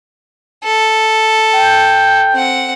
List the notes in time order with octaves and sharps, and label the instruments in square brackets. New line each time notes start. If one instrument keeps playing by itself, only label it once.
[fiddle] A4
[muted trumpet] G5
[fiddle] C4 F#5